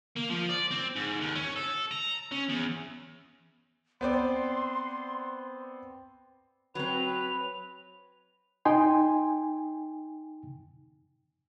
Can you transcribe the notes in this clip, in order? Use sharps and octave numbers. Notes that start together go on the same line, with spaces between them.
A#3
F3
D5
C4
G#2
D#2
C#4
A4
A#5
C#4
E2
B3 C4 D5 C6
F#3 C4 B4 F7
D#4 G5 G#5 C6